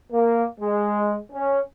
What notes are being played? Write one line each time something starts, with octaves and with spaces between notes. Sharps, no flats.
A#3
G#3
C#4